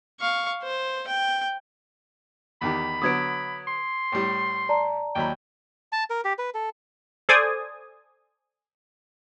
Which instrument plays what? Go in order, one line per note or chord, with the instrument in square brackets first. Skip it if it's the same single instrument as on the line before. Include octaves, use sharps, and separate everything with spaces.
[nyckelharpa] F5 C#6
C5
G5
[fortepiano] E2 D#3 G4 [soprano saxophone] B5
[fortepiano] D3 F#3 B3 [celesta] D#6 G#6 D7
[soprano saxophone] C6
[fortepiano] A2 G3
[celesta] D5 A5 A#5
[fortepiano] D#2 F#3 B5 [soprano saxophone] G5
[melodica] A5
A#4
G4
B4
A4
[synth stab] A4 C5 D5 G#5 D#6